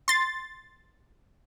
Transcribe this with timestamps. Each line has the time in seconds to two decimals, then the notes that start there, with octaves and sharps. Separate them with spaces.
0.08 C6 A6